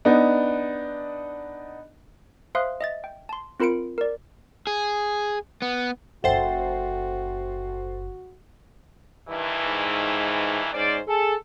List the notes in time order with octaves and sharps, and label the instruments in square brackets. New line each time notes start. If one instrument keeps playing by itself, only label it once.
[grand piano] B3 D4 D#4
[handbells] C5 E5 F5 C6 D#6 F#6
D#5 E5 A6
G5
A5 C6
C4 F4 A#4 B5 C#7 D7
A#4 D5
[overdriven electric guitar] G#4
B3
[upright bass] F#1 C#3 [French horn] F#4 [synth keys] A4 C5 [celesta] E5 F#5 G5
[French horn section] G2 D#3 E3
[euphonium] G#2
[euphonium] G#2 [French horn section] C#4 C5 D5
[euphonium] G#4 [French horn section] A4